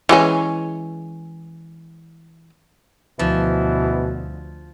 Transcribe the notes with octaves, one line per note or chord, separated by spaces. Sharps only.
E3 G#3 C#4
D2 B2 E3 F3